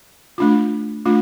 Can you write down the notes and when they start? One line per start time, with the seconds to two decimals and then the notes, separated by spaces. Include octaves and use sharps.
0.38 A3 D4 F4
1.05 A3 D4 F4